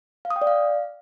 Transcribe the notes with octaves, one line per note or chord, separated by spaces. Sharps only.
F5
D#6
G5
D5
F5